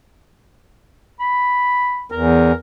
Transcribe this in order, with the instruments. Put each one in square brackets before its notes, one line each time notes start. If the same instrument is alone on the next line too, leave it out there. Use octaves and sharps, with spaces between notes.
[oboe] B5
[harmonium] E2 [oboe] A#4